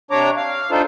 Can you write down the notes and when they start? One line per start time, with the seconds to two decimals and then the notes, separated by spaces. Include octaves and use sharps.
0.11 C3 D4 C#5 A#5 D6
0.37 F5
0.71 D4 D#4 F4 A4 C5